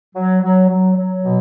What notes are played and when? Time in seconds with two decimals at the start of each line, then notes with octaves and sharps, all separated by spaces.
0.16 F#3
0.42 F#3
0.69 F#3
0.96 F#3
1.23 B2